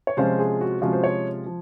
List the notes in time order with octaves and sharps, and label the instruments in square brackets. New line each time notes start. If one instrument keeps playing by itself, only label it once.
[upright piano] C#5
[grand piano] C3 F3 G#3 C#4 F4 [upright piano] C5
[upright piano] G#4
F#4
[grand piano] C3 F3 G#3 C#4 F4 [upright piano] F#4
[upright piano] C5
C#5
[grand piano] F3